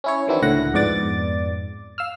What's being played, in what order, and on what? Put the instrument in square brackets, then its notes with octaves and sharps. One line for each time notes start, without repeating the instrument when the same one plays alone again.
[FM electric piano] C#4 E4 C#5
D#3 E3 F#3 C4 D4 E4
C#2 A2 D3 F#5 A#6
F2 G#2 B3 D5 D6 A6
F5 E6 F6